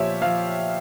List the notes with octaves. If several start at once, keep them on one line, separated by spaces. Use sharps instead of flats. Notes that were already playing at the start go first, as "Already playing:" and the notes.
Already playing: A#2 F3 G4 C#5 E5
F3 F5